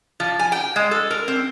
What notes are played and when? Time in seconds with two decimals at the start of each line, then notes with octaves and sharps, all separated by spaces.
0.20 F3
0.39 G#5
0.52 G5
0.76 G#3
0.91 A4
1.10 A#4
1.28 C4